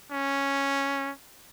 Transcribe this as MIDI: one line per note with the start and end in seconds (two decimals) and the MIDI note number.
0.12 1.10 61